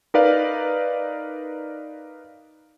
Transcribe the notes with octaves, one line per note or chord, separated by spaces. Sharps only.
D#4 A#4 B4 D5 F5